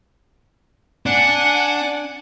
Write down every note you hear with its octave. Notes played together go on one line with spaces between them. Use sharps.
D4 F#5 G#5